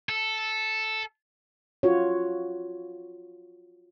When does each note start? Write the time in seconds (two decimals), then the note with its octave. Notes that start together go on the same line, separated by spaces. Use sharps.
0.09 A4
1.83 F4 F#4 C#5